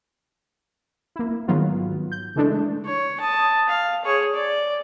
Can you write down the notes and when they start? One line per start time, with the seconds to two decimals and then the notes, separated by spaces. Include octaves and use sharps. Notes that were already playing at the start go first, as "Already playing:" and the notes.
1.16 A#3 E4
1.48 G#2 D#3 F#3 B3 F4
2.12 G6
2.36 C#3 E3 G#3 A3 D4
2.86 C#5
3.20 A5 D#6
3.69 F5
4.05 G#4 C#5
4.35 D5